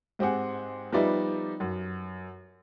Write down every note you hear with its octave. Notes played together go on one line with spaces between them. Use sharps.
G#2 C4 G4 G#4 F#5
F3 G3 B3 D#4 D5 E5
F#2